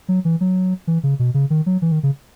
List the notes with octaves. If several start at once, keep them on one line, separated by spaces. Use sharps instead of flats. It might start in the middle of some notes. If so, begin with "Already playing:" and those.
F#3
E3
F#3
E3
C#3
B2
C#3
D#3
F#3
E3
D#3
C#3